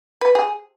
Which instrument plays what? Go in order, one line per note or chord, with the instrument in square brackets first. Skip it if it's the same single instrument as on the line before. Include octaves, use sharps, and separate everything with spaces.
[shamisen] B4
G#4